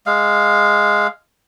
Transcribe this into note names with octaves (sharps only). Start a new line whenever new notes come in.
G#3 F5